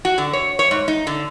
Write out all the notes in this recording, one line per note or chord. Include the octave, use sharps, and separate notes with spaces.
F#4
D3
C#5
C#5
G#2
D#4
D3